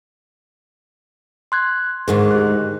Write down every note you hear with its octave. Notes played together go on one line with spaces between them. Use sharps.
C6 F#6 G#6
D2 G#2 D#3 G#4
G4 F#6